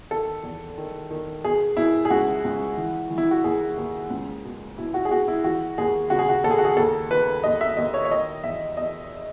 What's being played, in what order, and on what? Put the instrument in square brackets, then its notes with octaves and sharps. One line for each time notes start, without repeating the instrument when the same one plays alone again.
[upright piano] D#3 A4
E2
D#3
D#3
B2 G#4
B2 E4
G#4
C#2 F#4
C#2
E3
E3
E4
F#4
D#2 G#4
D#2
C#2
B2
B2 E4
F#4
G#4
B2 F#4
E4
E3 F#4
D#2 G#4
C#3 F#4
G#4
F#4
D#2 A4
G#4
F#4
G#4
D#2 A4
D#3 B4
D#2 D#5
E5
D#2 D#5
C#5
C#5
D#3 D#5
E2 E5
E2 D#5